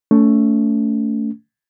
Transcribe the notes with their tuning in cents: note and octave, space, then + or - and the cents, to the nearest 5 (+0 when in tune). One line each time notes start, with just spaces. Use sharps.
A3 +10 C#4 +35